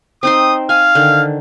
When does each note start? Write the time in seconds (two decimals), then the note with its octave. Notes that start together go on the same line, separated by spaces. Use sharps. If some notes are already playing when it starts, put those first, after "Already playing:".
0.23 C4 D#4 C6 D#6
0.69 F5 G#5
0.95 D3 D#3